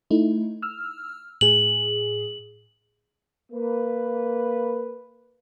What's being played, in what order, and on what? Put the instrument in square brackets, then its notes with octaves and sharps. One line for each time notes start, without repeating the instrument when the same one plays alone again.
[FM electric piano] A3 D#4 E4
E6 F6
[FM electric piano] A2 G#4 [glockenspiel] F#7
[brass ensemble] A#3 B4